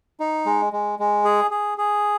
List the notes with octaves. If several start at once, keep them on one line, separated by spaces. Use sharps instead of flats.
D#4
G#3
G#3
G#3
G#4
G#4
G#4